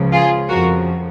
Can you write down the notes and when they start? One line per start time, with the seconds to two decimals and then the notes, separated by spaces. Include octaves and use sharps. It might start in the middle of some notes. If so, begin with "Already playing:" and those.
Already playing: C#2 C#3 F3
0.12 F4 G#4
0.49 F2 C#3 F3 F#4 A#4